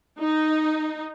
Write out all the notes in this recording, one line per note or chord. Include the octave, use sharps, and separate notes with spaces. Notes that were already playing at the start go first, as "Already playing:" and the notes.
D#4